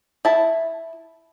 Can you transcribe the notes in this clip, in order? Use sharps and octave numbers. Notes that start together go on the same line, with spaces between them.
E4 A5